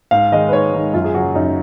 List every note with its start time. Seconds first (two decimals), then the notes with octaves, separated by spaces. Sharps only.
0.11 G#2 F5
0.32 D#3 G#3 D#5
0.49 B4
0.52 G#2 C#5
0.73 D#3 G#3
0.93 F#2 F4
1.05 G#4
1.14 C#3 F#3 F#4
1.35 F#2 D#4